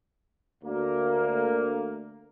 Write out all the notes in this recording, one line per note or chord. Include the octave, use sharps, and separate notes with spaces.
D2 A#3